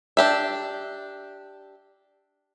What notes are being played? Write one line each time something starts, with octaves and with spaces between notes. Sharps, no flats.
D4 G4 E5